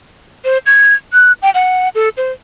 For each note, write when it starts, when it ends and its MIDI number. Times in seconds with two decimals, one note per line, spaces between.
0.45 0.58 72
0.66 0.94 92
1.13 1.32 90
1.42 1.50 79
1.54 1.89 78
1.95 2.09 69
2.17 2.32 72